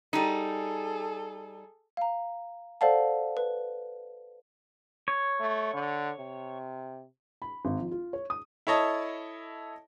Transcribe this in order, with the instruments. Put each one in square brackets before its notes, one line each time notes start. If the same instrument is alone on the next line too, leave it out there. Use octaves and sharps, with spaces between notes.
[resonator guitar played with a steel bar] G3 D#4 [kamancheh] G#4 A4
[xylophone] F5 A#5
A4 C5 D5 F5 F#5 A5
B4
[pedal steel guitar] C#5
[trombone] A3
D3
C3
[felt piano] B5
G#1
F3
F4
C#5
D#6
[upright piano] E4 A4 C#5 D#5 A5